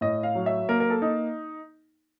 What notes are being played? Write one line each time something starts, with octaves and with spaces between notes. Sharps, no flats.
A2 D#5
F5
F#3
E5
A#3 A#4
A#4
A4
D#4